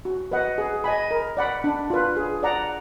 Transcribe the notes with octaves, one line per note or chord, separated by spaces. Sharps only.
F#4
B4 D#5 F#5
G#4
D#5 G#5 B5
A#4
D5 F#5 B5
D4
F4 B4
G#4
D5 F#5 A#5